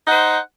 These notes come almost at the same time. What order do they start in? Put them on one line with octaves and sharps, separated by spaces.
D#4 F#5 C5